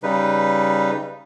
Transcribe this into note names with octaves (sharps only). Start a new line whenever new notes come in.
C#3 G3 D#4 B4